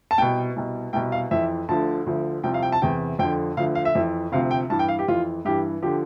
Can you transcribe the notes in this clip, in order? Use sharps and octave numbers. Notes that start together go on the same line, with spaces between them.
A5
C2 B2 G5
C2 B2
C2 B2 G5
F5
F2 E3 E5
D2 D3 F3 A5
D2 D3 F3
C2 C3 F3 G5
F5
G5
A5
E2 C3 E3 G5
F2 D3 F3 G5
D2 D3 F3 F5
F5
E5
F2 E3
D2 C3 F3 F5
G5
G2 E3 A5
G5
F5
G4
F2 E3 F4
G2 E3 G4
D3 F3 G4